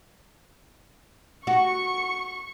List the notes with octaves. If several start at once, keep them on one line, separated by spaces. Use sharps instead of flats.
F#4 C#6 C#7